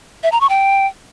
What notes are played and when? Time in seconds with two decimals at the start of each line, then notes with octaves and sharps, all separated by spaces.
0.23 E5
0.32 A#5
0.41 C#6
0.49 G5